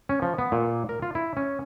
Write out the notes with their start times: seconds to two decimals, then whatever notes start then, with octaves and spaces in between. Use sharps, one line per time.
0.09 C#4
0.22 F3
0.38 B3
0.52 A#2
0.89 A#4
1.02 F4
1.15 E4
1.37 C#4